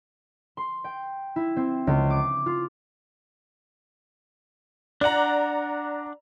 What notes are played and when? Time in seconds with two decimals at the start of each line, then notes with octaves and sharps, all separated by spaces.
0.57 C6
0.84 G5
1.36 E4
1.56 C4
1.87 C#2
2.10 D6
2.46 F4
5.01 D4 D5 F#5 A#5